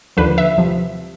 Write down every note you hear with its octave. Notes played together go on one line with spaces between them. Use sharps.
D#2 D3 F3 B4
E5
C3 F3